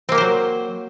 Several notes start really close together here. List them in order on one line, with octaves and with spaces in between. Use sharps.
C4 A#3 G4 C5 F#3